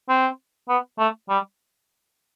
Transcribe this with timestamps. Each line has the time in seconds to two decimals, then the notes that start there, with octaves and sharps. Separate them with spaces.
0.09 C4
0.69 B3
0.99 A3
1.29 G3